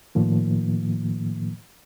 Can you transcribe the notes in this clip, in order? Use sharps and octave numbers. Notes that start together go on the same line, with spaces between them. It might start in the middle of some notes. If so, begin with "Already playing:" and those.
A2 D#3 F3 A#3